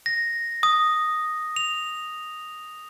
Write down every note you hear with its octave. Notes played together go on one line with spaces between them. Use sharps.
A#6
D#6
F7